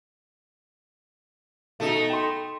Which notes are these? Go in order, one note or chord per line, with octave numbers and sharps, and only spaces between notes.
B2 A3 D#4
G5 B5 C6